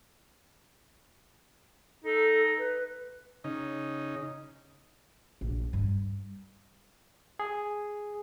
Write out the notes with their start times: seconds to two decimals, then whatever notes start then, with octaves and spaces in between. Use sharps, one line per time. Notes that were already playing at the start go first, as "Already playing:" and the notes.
2.05 D#4 A4
2.58 B4
3.44 C#3 D#4
5.41 A#1
5.73 G2
7.39 G#4